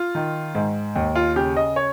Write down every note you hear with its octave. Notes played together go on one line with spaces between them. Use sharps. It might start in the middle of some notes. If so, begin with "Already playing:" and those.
Already playing: F4
D#3
G#2
D#2
F4
C#3 G4
D#5
C#5